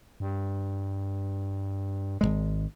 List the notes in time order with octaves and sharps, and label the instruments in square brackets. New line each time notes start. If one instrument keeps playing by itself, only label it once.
[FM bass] G2
[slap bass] G#1 C#2 G#3